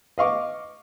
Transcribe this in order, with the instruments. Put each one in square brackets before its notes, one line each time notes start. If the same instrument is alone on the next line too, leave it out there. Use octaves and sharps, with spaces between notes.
[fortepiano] D#5 F5 C#6 D6